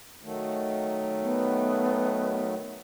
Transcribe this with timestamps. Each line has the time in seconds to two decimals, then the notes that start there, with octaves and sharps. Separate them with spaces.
0.23 D#3 F#3 A3
1.22 B3